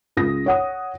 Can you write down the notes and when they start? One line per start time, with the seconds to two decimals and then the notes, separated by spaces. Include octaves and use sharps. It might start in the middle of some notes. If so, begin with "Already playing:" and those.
0.17 C#2 F4 D#6 A#6
0.46 C#5 F#5 D#6